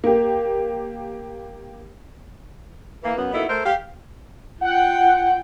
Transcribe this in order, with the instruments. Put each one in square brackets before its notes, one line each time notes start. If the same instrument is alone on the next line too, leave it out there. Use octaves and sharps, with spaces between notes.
[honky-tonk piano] A#3 G4
[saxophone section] E3 A#3
F#2 B3
A#3 B3 D#4 E4 F#4 A4
A3 A#4 C5
G4 F5
[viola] F4 G5 [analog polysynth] F#5